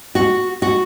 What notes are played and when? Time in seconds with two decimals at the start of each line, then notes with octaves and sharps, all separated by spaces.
0.15 F#4
0.62 F#4